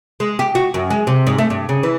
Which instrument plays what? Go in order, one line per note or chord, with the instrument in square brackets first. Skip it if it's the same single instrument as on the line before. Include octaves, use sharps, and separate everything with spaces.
[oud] G#3
G4
F#4
F#2
G#3
C3
G#2
A3
G2
C#3
E3